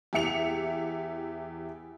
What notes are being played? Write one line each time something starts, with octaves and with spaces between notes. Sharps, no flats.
E2 G4 E5 C#7 F7